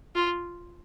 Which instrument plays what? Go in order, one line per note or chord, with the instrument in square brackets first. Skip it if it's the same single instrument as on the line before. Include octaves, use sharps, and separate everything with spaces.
[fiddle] F4